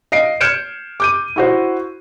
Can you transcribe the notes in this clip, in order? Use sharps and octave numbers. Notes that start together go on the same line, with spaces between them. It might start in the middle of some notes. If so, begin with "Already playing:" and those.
D#5 F5 C7 D7
F6 G6 G#6 C#7 D7 E7
D6 G6 D#7
E4 F#4 C5